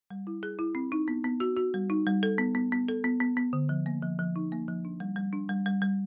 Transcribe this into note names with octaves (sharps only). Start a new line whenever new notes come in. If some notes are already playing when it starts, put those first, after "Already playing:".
G3
E4
G#4
E4
C4
D#4
B3
B3
F#4
F#4
G3
D#4
G3
A4
B3
B3
B3
A4
B3
B3
B3
D3
F3
A#3
F3
F3
D#4
A#3
F3
D4
G3
G3
D4
G3
G3
G3